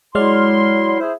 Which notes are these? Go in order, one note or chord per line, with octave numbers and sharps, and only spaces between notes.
F#3 G#3 E4 D5 C6 F6
E4 G#4 C5